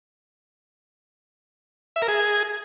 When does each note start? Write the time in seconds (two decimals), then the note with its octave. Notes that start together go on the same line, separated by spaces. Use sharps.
1.96 E5
2.02 A#4
2.08 G#4